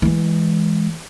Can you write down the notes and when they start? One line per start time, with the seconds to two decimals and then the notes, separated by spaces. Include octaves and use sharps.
0.02 E3 G#3